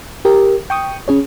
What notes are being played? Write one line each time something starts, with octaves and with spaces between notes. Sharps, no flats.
G4 A#4
G5 C#6 D#6
C#4 G#4 C#5